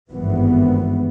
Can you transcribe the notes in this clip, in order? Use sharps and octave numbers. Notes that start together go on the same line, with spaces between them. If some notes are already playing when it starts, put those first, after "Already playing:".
G#1 G2 E3 B3